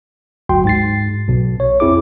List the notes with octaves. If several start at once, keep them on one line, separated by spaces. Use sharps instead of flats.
G1 D2 F#3 F#4 G5 C6
G#2 A6 C7
B1 B2
C#5
F2 C4 E4 G#4 D6